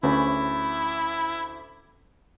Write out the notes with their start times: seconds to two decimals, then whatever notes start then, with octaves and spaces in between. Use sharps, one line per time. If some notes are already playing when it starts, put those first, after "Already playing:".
0.03 D2 C#4 E4 B4